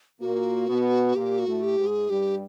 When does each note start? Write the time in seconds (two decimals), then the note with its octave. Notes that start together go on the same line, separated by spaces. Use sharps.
0.21 A#2 A#3 F#4
0.68 B2 B3
1.16 A#2 A#3 G4
1.39 F#4
1.47 A2 A3
1.62 G4
1.79 G#2 G#3
1.87 G#4
2.10 G2 G3 G4